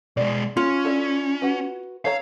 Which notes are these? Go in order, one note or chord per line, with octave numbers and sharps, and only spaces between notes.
B2 G#3 D5
C#4 F4
D4 E4 A4
F#4 B4
A4 C#5 F5 A#5